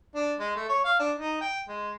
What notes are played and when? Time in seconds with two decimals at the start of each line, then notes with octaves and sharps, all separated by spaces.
0.15 D4
0.39 G#3
0.55 A3
0.68 C#5
0.84 F5
0.99 D4
1.18 D#4
1.41 G5
1.68 G#3